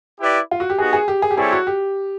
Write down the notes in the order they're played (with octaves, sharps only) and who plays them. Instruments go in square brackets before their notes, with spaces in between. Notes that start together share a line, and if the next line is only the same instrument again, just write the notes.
[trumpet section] E4 G4 B4 D5
[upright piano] F4
F#4
G4
[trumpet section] B3 D#4 F#4 [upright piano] G#4
[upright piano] G#4
G4
G#4
G4
[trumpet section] G3 C4 E4 A4 C#5 [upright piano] G#4
[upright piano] F#4
G4